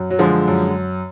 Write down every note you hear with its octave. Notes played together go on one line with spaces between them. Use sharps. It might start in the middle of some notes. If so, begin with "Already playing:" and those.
Already playing: F#2
F#3
D3 F3 G#3
F#2